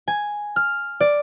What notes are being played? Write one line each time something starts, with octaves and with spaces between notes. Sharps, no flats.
G#5
F6
D5